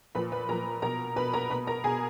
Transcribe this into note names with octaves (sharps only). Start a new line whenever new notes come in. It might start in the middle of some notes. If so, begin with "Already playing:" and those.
A#2 F3 B4 B5
B4 B5
A#2 F3 A#4 A#5
B2 A#4 A#5
B2 B4 B5
A#4 A#5
B2 B4 B5
A#4 A#5
B2 G#4 G#5